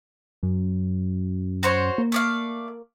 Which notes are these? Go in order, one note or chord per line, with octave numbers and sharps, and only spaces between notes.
F#2
F#4 C5 C#5
A#3
A3 D5 F5